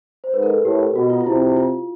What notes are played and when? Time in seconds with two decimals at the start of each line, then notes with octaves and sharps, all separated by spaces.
0.24 C5
0.34 G#2 B4
0.43 A#4
0.50 A4
0.64 A2 G4
0.95 B2 F#4
1.10 F4
1.21 F4
1.26 C3 E4
1.57 F4